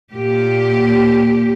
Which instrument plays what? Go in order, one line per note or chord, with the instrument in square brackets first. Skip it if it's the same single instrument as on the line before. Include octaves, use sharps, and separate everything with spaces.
[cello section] A#2 A#3 G4